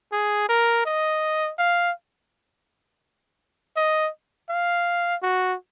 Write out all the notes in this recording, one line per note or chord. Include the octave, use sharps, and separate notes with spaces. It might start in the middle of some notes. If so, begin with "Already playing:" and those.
G#4
A#4
D#5
F5
D#5
F5
F#4